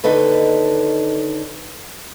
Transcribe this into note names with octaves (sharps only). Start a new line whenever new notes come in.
D#2 D3 D#4 A4 B4